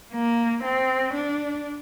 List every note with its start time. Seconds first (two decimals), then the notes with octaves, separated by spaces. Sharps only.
0.14 A#3
0.64 C4
1.14 D4